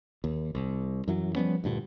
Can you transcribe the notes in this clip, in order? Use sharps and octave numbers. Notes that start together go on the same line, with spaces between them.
D#2
C2
F#2 E3 F#3
F3 G3 B3 C#4
D2 G2 A#2 D3